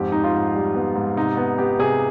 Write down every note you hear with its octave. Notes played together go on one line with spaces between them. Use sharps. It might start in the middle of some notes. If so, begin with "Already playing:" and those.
Already playing: F2 G#2 G4
G#2 D#4
F4
G#2
G3
B3
G#2
C3 D#4
B3
B3 G4
C3 G#4